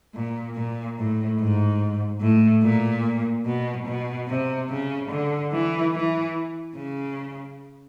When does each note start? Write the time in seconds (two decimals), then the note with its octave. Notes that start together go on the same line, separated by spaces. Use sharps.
0.15 A#2
0.56 A#2
0.98 A2
1.39 G#2
2.21 A2
2.63 A#2
3.46 B2
3.87 B2
4.28 C3
4.70 C#3
5.11 D3
5.52 E3
5.94 E3
6.76 C#3